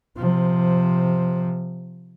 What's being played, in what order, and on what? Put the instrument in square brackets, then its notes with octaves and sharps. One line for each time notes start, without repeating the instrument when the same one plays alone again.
[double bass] C3 F3